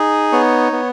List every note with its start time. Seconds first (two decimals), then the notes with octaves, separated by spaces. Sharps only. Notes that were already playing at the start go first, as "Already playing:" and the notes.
Already playing: D#4 G#4
0.32 B3 C#5
0.72 B3